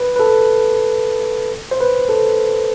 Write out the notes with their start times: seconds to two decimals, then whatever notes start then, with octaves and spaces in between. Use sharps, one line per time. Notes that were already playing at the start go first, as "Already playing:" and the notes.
Already playing: B4
0.16 B4
0.20 A4
1.71 C5
1.81 B4
2.09 A4